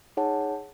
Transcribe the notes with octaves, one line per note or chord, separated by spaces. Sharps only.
D#4 G#4 C#5 F#5 A5